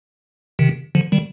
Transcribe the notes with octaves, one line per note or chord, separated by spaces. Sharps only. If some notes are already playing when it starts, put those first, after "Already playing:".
C3 D#3
D3 F3
D#3 G3